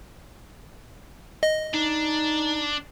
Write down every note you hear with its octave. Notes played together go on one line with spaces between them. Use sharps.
D#5
D4 D#4